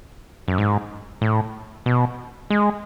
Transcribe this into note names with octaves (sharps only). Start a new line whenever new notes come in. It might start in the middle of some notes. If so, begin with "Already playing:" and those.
F#2
G#2
A2
B2
G#3